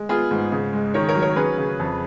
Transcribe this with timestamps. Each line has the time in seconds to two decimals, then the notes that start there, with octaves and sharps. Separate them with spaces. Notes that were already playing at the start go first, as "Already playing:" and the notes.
Already playing: G#3
0.09 B3 F4 G#4
0.31 G#2
0.52 C#3
0.73 G#3
0.94 D#3 A#4 C#5
1.09 A#4 C#5
1.15 F#3
1.22 A#4 C#5
1.36 C#4 G#4 B4
1.58 C#3
1.80 F2